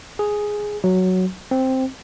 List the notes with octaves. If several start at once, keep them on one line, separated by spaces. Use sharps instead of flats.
G#4
F#3
C4